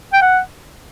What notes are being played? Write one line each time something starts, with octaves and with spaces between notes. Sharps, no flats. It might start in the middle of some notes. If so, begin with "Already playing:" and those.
G5
F#5